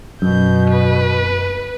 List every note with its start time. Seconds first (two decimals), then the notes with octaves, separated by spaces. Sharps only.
0.22 F#2 B2 G6
0.71 B4